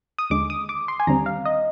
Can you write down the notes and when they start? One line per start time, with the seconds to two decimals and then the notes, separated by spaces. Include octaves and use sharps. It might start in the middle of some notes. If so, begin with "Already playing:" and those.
0.19 D#6
0.30 D#2 D3 G#3 D6
0.50 D#6
0.69 D6
0.88 C6
1.00 G#5
1.07 D#2 D3 G3 C4 A#5
1.26 F5
1.45 D#5